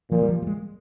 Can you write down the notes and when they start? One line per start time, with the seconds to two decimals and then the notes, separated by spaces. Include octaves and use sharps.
0.11 A#2 F3
0.22 G3
0.29 F3
0.42 G3
0.47 G#3